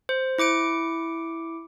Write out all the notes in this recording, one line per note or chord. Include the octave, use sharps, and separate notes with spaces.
C5
E4 D6 C#7 D7